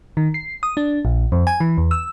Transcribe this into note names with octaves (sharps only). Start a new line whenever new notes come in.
D#3
C7
D#6
D4
A#1
F2
G#5
E3
E2
E6